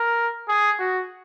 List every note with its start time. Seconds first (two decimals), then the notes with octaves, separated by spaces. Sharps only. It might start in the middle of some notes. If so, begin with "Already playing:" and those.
Already playing: A#4
0.48 G#4
0.79 F#4